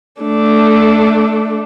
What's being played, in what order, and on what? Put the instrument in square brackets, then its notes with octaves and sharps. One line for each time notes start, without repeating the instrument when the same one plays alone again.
[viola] A3 D4